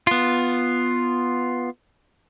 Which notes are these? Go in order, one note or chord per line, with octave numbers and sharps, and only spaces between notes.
B3 F4